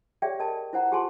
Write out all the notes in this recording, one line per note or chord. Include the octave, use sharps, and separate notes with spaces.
G4 G#4 C#5 D5 E5 G5
A#4 D#5 A5
E4 C5 F#5 A#5
F4 G4 G#4 G#5 A5 C6